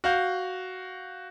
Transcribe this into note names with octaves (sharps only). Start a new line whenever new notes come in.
F#4 F5 G6